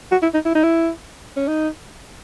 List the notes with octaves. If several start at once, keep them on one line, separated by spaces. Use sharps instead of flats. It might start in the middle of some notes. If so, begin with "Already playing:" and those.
F#4
E4
D#4
E4
D#4
E4
C#4
D#4